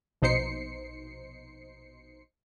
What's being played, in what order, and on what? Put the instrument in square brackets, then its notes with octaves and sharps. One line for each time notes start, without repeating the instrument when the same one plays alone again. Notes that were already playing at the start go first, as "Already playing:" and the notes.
[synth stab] A#1 B2 D#4 C5 C7 C#7